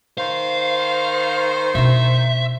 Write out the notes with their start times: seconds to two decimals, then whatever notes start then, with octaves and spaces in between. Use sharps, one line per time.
0.18 D#3 C5 F5
1.75 B2 D4 E5